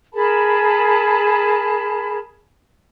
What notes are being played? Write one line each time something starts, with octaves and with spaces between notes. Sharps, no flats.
G#4 A#4 A5 B5